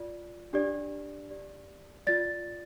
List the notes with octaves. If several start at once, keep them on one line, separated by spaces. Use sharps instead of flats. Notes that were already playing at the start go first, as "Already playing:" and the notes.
Already playing: F4 D5
D4 G4 D5
G4 D5
F4 D5 A6